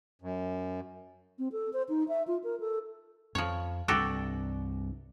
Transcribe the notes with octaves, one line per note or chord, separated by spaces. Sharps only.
F#2
C4
A4
C5
D#4
E5
F4
A#4
A4
F2 F3 C#5
C2 G2 F#4 G4 A4